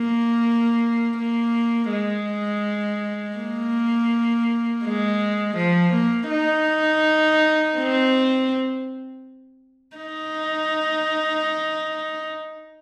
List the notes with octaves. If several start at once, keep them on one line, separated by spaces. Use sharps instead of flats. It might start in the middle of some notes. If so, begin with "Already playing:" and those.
Already playing: A#3
A#3
G#3
A#3
G#3
F3
A#3
D#4
C4
D#4